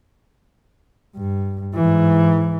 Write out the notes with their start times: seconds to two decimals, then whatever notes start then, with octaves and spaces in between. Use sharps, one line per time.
1.16 G2
1.74 G#2 E3